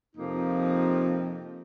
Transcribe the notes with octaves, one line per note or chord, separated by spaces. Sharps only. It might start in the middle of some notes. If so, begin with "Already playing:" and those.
F2 C3 F3 A#3 D#4